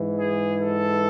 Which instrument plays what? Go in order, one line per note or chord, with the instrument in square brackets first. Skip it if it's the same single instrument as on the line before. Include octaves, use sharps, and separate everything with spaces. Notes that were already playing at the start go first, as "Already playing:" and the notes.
Already playing: [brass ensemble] G#2 E3
G#4
A4